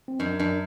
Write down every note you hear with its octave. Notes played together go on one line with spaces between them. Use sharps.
C4
F#2 D4
F#2 D4